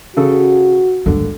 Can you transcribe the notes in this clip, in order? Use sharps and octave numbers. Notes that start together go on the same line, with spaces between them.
C#3 C#4 F#4 A4
D#2 G#2 D3